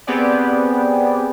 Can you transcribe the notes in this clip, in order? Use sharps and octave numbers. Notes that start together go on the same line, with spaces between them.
B3 C4 G4 G#4 D5